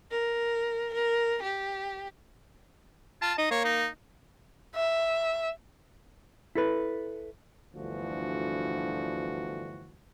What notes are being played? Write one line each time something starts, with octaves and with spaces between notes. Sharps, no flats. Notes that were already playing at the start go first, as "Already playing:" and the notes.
A#4
A#4
G4
F4 A5
D#4 D#5
A#3 C#5
D#4
E5
E4 A4 B4
G1 D2 D3 E3 F3 F#4